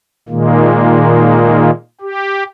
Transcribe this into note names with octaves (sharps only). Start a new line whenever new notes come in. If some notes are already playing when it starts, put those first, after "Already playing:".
A#2 D#3 G#3 A#3
G4